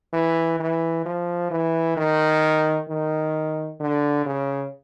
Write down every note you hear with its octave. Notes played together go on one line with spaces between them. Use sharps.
E3
E3
F3
E3
D#3
D#3
D3
C#3